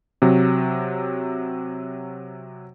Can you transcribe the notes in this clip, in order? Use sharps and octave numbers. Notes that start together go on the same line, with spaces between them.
C3 F#3